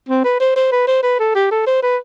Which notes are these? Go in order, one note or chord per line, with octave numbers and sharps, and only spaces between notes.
C4
B4
C5
C5
B4
C5
B4
A4
G4
A4
C5
B4